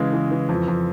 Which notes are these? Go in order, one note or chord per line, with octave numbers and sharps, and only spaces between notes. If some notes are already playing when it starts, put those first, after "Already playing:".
Already playing: C#3 E3 G#3
E3
E3
F2
F2